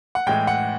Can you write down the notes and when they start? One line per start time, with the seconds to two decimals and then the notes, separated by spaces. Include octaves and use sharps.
0.15 F#5
0.27 A2 E3 G#3 G5
0.47 F#5